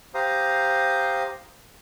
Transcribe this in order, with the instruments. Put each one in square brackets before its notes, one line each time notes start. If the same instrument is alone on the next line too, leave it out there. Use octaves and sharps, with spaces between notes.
[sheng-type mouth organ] G4 C5 F5 A#5 D#6